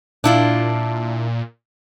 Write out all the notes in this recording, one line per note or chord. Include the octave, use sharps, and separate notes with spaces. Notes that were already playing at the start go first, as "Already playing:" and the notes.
A#2 D4 E4 F4